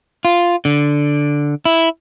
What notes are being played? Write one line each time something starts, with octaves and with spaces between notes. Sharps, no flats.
F4
D3
E4